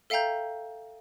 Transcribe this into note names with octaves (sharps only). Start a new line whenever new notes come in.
A4 E5 F5 G5 A#5 G6